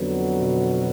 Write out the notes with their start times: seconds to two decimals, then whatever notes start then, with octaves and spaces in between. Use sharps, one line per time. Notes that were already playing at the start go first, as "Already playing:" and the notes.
Already playing: F2 D3 F#3 B3
0.38 B2